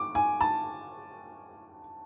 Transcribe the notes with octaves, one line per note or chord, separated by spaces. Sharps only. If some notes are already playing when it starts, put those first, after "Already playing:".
Already playing: D6
G#5
A5